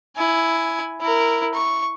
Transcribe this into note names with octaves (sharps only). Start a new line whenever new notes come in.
E4 G#5
E4 A#4
C#6